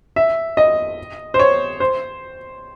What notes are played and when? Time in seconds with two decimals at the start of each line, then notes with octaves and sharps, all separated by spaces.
0.16 E5
0.57 D#5
1.34 C5
1.40 C#5
1.80 C5